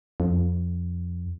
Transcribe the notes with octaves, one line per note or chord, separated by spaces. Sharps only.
F2